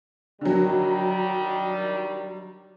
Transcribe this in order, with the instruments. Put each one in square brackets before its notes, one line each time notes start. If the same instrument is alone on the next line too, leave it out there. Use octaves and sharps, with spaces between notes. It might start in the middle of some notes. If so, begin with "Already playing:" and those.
[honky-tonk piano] D3 F#3 [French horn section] D#3 G3